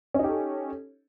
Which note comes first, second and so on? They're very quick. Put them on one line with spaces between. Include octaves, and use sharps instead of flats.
C#4 D#4 G4 A4